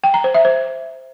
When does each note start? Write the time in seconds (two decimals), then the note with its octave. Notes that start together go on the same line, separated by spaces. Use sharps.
0.04 G5
0.14 A#5
0.24 C5
0.34 E5
0.45 C5